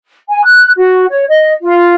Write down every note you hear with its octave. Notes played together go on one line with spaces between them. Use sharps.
G#5
F#6
F#4
C#5
D#5
F4